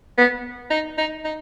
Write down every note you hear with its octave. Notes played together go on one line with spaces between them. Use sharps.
B3
D#4
D#4
D#4